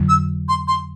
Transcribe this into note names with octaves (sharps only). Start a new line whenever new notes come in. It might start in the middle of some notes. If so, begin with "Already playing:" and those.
Already playing: F2 D3 F#3
E6
C6
C6